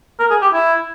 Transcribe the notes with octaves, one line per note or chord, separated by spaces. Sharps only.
A#4
G#4
G4
E4